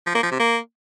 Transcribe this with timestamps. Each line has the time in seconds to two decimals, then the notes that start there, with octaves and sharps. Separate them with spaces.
0.07 F3
0.15 A#3
0.23 F3
0.31 C3
0.40 A#3